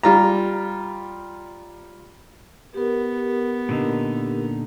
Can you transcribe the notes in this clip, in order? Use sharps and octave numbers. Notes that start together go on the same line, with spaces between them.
G3 F4 A#5
B3 G4 A#4
A#2 D3 D#4